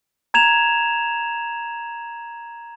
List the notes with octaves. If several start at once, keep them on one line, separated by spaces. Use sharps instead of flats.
A#5 G#6 E7 F7